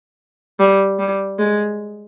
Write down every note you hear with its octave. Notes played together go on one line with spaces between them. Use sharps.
G3
G3
G#3